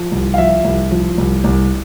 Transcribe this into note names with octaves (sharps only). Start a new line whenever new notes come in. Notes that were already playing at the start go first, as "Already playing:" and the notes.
Already playing: F3
C2
F5
F3 E5
C2
F3
C2
C2